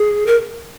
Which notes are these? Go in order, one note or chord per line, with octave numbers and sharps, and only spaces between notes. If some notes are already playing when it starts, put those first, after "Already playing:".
Already playing: G#4
A#4